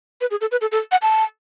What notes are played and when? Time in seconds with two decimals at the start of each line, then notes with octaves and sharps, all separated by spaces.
0.21 B4
0.31 G#4
0.41 A4
0.51 B4
0.61 A4
0.72 A4
0.92 F#5
1.02 A5